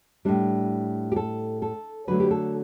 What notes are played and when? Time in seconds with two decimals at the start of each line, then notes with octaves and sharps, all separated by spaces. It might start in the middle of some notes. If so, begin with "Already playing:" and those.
0.25 A2 G3 D4
1.12 G4
1.16 A4
1.62 A4
2.07 D3 F#3 A3 B4
2.20 G4
2.31 A4